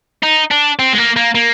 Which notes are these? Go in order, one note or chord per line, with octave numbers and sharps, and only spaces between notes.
D#4
D4
C4
G#3
A#3
A#3
A#3